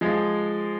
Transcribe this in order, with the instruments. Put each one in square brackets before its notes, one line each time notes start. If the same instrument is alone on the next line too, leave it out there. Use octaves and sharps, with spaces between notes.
[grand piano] F3 G#3